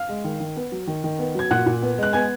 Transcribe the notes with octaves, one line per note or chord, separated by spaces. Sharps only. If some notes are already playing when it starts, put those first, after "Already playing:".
Already playing: F5 F6
G#3
D#3
D#3
B3
F#3
D#3
D#3
B3
F#3 G#6
A#2 F#5 F#6
A#2
B3
G#3 F#6
B3 G#5 G#6